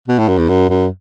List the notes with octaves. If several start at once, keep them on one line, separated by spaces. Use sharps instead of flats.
B2
A2
F#2
E2
F#2
F#2